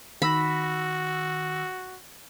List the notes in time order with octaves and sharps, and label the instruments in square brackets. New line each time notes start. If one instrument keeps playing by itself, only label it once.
[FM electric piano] D#3 E6 A#6 [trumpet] F#4 [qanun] B5